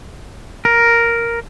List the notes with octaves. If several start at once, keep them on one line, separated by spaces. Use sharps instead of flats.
A#4